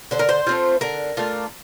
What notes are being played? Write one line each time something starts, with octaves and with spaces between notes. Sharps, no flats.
D3 C5
A#4
C5
A3 C4 F4
D3 A#4
A3 D4 F4